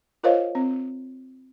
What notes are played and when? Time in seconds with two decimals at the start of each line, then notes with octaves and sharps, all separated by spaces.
0.23 F4 A#4 C5 C#5 D#5 F5
0.55 C4